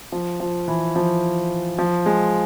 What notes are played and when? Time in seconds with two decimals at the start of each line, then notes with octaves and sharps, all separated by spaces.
0.12 F3
0.40 F3
0.68 E3
0.96 F3
1.79 F3
2.06 G#3